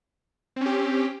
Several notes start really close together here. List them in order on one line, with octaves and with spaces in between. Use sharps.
C4 C#4 G4